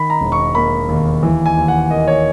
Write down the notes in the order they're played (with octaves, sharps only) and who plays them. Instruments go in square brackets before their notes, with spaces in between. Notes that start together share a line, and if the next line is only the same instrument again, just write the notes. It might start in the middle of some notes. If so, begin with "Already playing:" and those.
Already playing: [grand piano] D#3 B5
A#5
E1
C#6
A#3 B5
D#2
E3
G#5
D#2
F#5
A#3 D#5
C#5